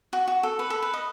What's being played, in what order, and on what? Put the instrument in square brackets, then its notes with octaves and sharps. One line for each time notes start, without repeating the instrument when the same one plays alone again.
[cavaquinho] F#4
F#4
A4
B4
A4
B4
D#5